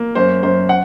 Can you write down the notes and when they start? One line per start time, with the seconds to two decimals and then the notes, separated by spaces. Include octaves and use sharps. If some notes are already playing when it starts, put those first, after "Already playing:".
Already playing: A#3
0.15 F#2 C5
0.43 F#2 C5
0.69 F#5